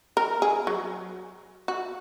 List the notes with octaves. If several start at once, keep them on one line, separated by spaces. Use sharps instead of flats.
A#4
G#4
F#3
F#4